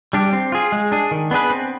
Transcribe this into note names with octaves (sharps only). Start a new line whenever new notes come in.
G3 D4 G4
C4
F4 G#4
G#3
D4 G#4
D#3
B3 D4 G#4 B4
C4